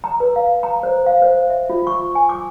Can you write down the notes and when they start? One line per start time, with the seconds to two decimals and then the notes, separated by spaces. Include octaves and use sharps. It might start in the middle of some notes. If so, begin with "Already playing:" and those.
0.04 A#5
0.20 B4
0.36 F5
0.63 A#5
0.83 C5
1.06 F5
1.22 C5
1.50 E5
1.70 F4
1.87 C#6
2.15 G#5
2.29 D6